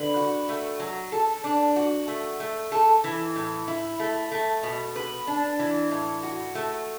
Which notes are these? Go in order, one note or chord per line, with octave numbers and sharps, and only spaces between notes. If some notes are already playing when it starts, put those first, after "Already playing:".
Already playing: D3 B4
F#4
A3
F#3
A4
D4
F#4
A3
A3
A4
E3
A2
E4
A3
A3
B2
B4
D4
E3
A2
F#4
A3